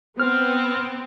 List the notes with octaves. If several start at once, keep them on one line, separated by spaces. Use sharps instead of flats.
B3 C4 F6